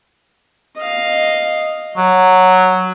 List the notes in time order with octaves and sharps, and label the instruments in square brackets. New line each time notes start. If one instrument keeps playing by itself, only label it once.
[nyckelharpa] D#5 F5
[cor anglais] F#3 [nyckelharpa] F#4